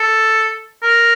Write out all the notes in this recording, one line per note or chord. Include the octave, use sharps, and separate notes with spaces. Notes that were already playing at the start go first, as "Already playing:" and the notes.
Already playing: A4
A#4